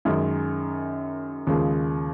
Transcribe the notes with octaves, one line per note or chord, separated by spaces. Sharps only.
F#2 D#3 G#3
D#2 C#3 F3 G#3